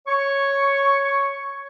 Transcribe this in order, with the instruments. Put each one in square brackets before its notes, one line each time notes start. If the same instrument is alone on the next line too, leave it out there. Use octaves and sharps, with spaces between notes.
[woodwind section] C#5 C#6